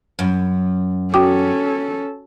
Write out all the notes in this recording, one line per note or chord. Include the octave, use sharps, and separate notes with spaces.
F#2
C#4 F#4 A4 G5 D6